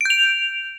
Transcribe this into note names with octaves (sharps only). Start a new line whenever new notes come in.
G6 D7 F7